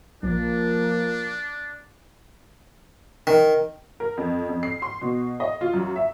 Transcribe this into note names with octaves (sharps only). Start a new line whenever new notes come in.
A#1 F3 A#3 D4
D#3
A#4
F2
F2
C7
C6
B2
D#5
F4
F#2
E5